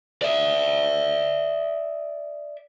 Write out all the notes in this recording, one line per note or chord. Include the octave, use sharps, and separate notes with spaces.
D5 E5